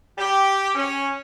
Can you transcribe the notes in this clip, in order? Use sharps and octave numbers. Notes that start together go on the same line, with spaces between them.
G4
C#4